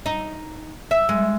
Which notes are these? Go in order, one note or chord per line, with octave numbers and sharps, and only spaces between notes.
D#4
E5
G#3